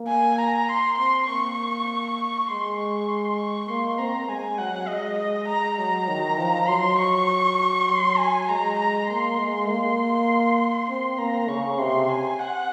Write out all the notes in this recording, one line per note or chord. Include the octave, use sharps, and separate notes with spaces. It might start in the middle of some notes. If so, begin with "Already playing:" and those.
Already playing: A#3
G#5
A#5
C6
C4 C6
A#3 C#6
G#3 C6
C#6
C6
C#6
A#3 C6
C4 A#5
G#3 G#5
F#3 F#5
G#3 D#5
D#5
G#3 A#5
F#3 A#5
D#3
F3
F#3 C6
C#6
F#3 C6
G#5
G#3 A#5
A#5
A#3 C6
G#3
A#3 C6
C4 C6
A#3 A#5
C#3 C#6
C3 C6
G#5
F#5